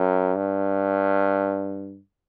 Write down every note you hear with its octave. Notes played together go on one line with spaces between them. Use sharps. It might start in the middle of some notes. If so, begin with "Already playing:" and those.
Already playing: F#2
G2